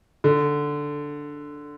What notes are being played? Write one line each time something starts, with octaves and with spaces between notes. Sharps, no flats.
D3